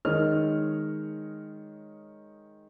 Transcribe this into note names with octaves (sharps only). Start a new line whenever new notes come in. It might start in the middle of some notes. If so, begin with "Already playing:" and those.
D#3 G#3 C#5 D#5 F6